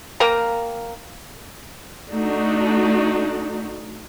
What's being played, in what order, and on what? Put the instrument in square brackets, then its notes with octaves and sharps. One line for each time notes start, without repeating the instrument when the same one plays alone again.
[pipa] A#3 A#4 G5 A#5
[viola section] A3 D4 D#4 F#4